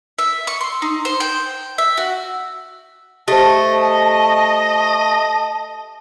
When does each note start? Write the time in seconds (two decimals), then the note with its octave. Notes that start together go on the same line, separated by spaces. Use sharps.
0.19 E5
0.47 C#6
0.61 C6
0.82 D#4
1.05 C5
1.20 G5
1.78 E5
1.97 F#4
3.28 A3 G4 C5 D#5 A5